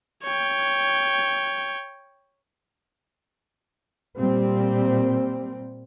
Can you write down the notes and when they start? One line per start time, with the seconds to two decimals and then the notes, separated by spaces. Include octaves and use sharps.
0.23 C#5 G5
4.17 A#2 G3 C4